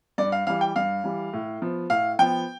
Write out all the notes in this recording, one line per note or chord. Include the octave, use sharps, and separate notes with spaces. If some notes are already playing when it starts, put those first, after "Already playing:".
G2 D5
F5
E3 G3 F5
G5
G2 F5
E3 G3
A2
F3 B3
A2 F5
F3 B3 G5